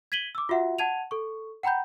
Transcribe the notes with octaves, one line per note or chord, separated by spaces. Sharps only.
G#6 B6 D#7 F#7 G7
D6 E6
F4 F#4 E5 F#5
F#5 A5 G#6 D#7 F7
A4 C#6
F#5 G5 A#5 B5 G6